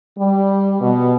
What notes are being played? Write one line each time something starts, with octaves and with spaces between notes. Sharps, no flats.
G3
B2